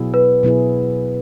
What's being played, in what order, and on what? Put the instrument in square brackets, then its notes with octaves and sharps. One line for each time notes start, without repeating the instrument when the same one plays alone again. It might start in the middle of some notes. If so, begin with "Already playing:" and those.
Already playing: [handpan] B2 F#3 B3 E4 G#4
[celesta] B4
[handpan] B2 F#3 B3 E4 G#4